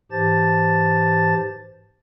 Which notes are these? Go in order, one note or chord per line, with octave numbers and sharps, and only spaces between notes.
G#2 E3 G4 C5 A5 A6